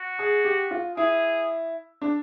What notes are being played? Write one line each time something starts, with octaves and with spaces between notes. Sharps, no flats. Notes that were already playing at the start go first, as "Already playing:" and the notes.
Already playing: F#4
G#4
G4
F4
E4 G#4
D4